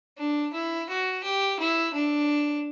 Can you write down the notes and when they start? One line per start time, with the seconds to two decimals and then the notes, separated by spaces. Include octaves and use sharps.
0.18 D4
0.53 E4
0.89 F#4
1.23 G4
1.60 E4
1.94 D4